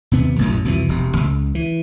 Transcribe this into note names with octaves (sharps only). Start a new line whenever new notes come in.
D#2 C3 B3
A1 F#2 A#2
C2 F2 B2 E3
E1 C3
C#2
E3